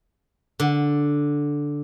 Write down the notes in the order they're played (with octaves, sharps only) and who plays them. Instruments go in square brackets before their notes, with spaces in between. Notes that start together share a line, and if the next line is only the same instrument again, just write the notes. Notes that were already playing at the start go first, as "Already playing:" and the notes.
[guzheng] D3